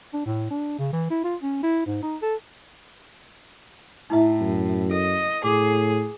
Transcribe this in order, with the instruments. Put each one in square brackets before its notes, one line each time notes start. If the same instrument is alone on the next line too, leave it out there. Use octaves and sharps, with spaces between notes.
[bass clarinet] D4
A2
D4
C#3
E3
E4
F4
C#4
E4
G#2
D#4
A4
[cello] A2 [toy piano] D#4 E4 E5
[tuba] F#2
[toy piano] A4 [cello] D#5
[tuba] A2 [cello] G#4 [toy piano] D6